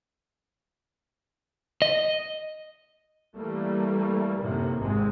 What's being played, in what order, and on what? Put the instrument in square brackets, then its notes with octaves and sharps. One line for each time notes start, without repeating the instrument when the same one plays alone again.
[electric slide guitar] D#5
[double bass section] E3 G3 A3 A#3
F#2 A2 C3 D#3 A#3
G#1 F2 G#2 C3 G#3 C4